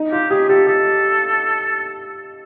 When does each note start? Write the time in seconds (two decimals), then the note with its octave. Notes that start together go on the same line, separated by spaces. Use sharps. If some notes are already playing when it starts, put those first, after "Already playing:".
Already playing: D#4
0.11 F4 G4
0.30 G4 G#4
0.49 G4 A4
0.67 G4 A4